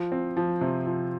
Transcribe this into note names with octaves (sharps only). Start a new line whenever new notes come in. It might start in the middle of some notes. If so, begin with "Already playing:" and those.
Already playing: F3
C4
F3
C3
F3